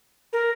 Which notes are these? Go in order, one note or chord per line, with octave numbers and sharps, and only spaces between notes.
A#4